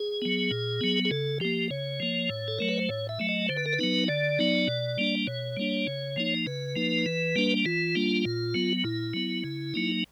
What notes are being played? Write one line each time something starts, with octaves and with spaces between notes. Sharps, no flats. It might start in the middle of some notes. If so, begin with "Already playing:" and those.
Already playing: G#4
F#3 B3
A#2
F#3 B3
G#4
C#3 A4
F3 A#3 G4
C#3 C#5
F3 A#3
A2
A4
F#3 A3 A#4
B4
C5
A2 C#5
E5
F#3 A3
D#5
D3 C5
B4
A#4
B4
F#3 B3 D#4
D3 D5
F#3 B3 D#4
B2
G3 A#3 D4
B2 C#5
G3 A#3 D4
C#3
F3 A#3 D#4
C#3 B4
F3 A#3 D#4
E3
G3 A#3 D4
E3 F4
G3 A#3 D4
A#2
F#3 B3
A#2 E4
F#3 B3
C#3
F#3 A#3 D#4